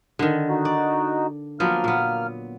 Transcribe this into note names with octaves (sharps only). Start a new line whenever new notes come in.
D3 D#3
D#4 F#4
D5
F3 F#3 A#3 B3 F6
A#2 B3